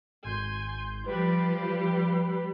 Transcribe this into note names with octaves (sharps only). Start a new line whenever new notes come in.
G#1 G#5 C6 G6
F3 G3 G4 B4 B5